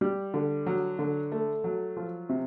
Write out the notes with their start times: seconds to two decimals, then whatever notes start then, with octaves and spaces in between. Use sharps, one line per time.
0.01 G3
0.34 D3
0.66 F#3
0.99 D3
1.32 A3
1.64 F#3
1.97 F3
2.29 C3